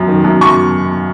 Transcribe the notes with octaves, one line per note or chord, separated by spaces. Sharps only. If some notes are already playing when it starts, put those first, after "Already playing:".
Already playing: F#2
D#3
F#2
F#2 C#6